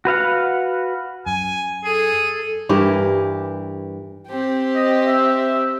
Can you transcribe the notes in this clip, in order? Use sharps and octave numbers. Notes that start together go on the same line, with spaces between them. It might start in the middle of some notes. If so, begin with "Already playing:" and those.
F#4 B4 F5 F#5
F#2 G#5
G#4 A4
G2 E3 G4 A#4
C4 G4
D#5
E5